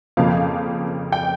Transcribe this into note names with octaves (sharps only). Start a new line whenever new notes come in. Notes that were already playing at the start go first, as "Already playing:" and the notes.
F2 C#3 F3 A#3 F5
G5